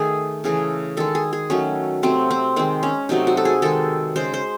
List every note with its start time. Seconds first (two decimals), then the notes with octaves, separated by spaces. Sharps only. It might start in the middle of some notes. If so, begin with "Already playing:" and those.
Already playing: D#3 A3 G#4
0.44 C#3 E3 A3 G#4
0.97 D#3 G#3 A4
1.15 G#4
1.33 G#4
1.50 D#3 F#3 A3 C#4
2.03 C3 F#3 A3 C4
2.31 C4
2.56 D#3 G#3 C4
2.83 C#4
3.09 C3 F#3 A3 D#4
3.27 F#4
3.37 A4
3.45 G#4
3.62 D#3 G#3 A4
4.16 C#3 G#3 C5
4.34 C5